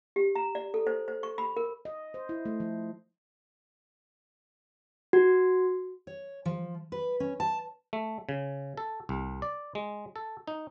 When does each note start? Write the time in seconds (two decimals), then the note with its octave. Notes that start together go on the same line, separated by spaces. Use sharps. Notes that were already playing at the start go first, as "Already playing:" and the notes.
0.16 G4
0.35 A#5
0.55 D5
0.74 A4
0.87 C5
1.08 C5
1.23 C#6
1.38 B5
1.57 A#4
1.85 D#5
2.14 C5
2.29 E4
2.45 A3
2.60 F3
5.13 F#4
6.07 C#5
6.45 F3
6.92 B4
7.20 C#4
7.40 A5
7.93 A3
8.29 C#3
8.77 A4
9.09 C2
9.42 D5
9.75 G#3
10.16 A4
10.47 D#4